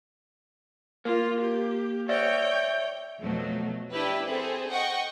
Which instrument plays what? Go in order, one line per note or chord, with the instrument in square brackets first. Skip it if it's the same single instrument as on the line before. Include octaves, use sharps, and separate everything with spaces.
[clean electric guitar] A#3 [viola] F4
[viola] G4
[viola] C#5 G5 [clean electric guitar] D5 E5
[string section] F2 B2 F#3 A3
D4 E4 G4 B4
C4 G#4 A4
D#5 F#5 G5 C#6